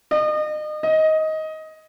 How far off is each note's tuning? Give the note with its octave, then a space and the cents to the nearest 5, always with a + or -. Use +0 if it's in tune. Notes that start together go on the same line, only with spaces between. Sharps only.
D#5 -35
D#5 +15